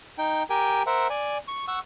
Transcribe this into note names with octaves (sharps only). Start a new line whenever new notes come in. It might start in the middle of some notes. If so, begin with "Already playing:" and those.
D#4 G5
G4 A#4 G5 G#5
A#4 C5 E5 F#5
D5 G#5
C#6
F#5 C#6 E6